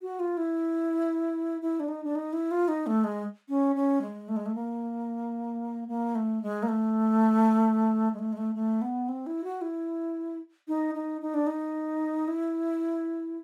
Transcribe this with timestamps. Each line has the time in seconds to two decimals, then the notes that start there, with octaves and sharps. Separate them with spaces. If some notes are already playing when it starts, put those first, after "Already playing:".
0.02 F#4
0.19 F4
0.37 E4
1.62 E4
1.80 D4
1.88 D#4
2.04 D4
2.15 D#4
2.33 E4
2.51 F4
2.68 D#4
2.87 A3
3.04 G#3
3.49 C#4
3.76 C#4
4.02 G#3
4.28 A3
4.36 G#3
4.46 A3
4.55 A#3
5.88 A#3
6.15 A3
6.42 G#3
6.63 A#3
6.69 A3
8.14 G#3
8.19 A3
8.33 G#3
8.37 A3
8.55 A3
8.82 B3
9.09 C4
9.27 E4
9.44 F#4
9.62 E4
10.68 D#4
10.95 D#4
11.21 D#4
11.34 D4
11.47 D#4
12.28 E4